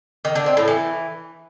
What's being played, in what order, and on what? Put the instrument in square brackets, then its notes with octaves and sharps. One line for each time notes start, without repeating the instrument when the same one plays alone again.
[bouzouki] D#3
D3
C4
A2
E3